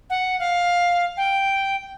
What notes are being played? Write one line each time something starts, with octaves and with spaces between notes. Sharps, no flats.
F#5
F5
G5